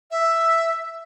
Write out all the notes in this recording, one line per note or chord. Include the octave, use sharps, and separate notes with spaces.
E5